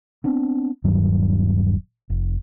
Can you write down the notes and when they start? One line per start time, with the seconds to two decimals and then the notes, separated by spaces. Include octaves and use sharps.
0.24 B3 C4 D4
0.84 D#1 G2 D#3 F#3
2.10 F1